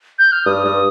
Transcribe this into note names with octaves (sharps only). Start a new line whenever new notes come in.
G6
F6
G2 D#6
G2